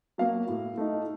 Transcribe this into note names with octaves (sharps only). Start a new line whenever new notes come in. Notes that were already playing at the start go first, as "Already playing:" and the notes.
F#3 A#3 F5
A2
A3 D#4